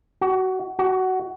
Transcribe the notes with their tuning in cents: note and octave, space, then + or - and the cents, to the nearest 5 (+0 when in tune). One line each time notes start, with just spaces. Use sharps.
F#4 +20
F#4 +15